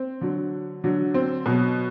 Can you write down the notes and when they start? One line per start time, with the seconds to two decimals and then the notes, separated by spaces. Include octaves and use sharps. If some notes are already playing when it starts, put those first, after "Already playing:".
Already playing: C4
0.21 D3 F#3
0.84 D3 F#3
1.14 C4
1.46 B2 F#3